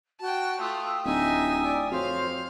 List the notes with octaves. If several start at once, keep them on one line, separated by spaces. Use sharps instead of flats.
F#4 G5 A5
A3 F4 G5 D#6 E6
D1 D#4 E5 G#5
D5
F2 F#4 C5 C#5 F5